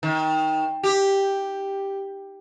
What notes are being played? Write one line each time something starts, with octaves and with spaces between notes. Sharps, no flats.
D#3
G4